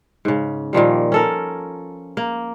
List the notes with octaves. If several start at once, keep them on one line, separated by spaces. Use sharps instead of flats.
G#2 C#3
A#2 D#3 F3 G3
C#4 A4 A#4
A#3